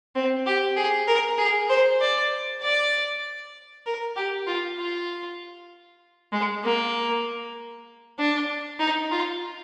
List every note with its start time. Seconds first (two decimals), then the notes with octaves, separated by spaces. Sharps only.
0.15 C4
0.46 G4
0.76 G#4
1.07 A#4
1.38 G#4
1.69 C5
2.01 D5
2.63 D5
3.86 A#4
4.16 G4
4.47 F4
4.78 F4
6.32 G#3
6.64 A#3
8.19 D4
8.79 D#4
9.11 F4